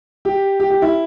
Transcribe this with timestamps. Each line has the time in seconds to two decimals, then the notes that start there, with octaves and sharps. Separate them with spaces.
0.25 G4
0.60 G4
0.70 G4
0.82 E4